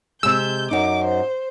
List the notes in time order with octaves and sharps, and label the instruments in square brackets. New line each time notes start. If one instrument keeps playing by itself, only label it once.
[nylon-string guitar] C3 G#3 [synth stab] E6 [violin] G6
[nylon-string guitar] F#2 D#4 [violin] D6
[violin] C5